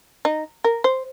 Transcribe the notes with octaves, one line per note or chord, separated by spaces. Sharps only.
D#4
A#4
C5